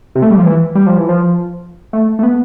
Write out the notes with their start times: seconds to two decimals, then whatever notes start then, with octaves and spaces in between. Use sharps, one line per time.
0.15 C3
0.22 A3
0.31 G3
0.38 F3
0.45 E3
0.75 G3
0.86 F3
0.98 E3
1.09 F3
1.93 A3
2.19 A3
2.23 B3